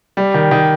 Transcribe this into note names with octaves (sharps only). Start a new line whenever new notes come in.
G3
D#3
D#3